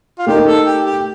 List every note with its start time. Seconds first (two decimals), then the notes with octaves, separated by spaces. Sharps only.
0.19 F4
0.26 A3 D#4 G4 A#4
0.46 A4
0.65 G4
0.84 G4